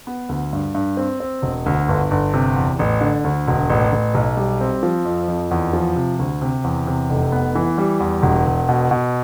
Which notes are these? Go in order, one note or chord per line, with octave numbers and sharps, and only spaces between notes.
B3
D2
G2
G2
C4
C4
E1
D2
G1
G1
C3
E2
A1
D3
D2
E1
A1
A1
B1
G3
C4
F3
F2
F2
E2
F3
C3
D2
C3
E2
C3
F1
B3
E3
G3
E2
E1
E1
B2
B2